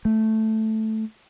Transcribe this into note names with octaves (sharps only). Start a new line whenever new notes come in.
A3